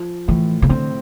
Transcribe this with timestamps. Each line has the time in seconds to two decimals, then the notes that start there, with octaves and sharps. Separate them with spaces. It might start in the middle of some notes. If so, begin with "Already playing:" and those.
Already playing: F3
0.28 A2 E3
0.62 C3
0.69 D3 C4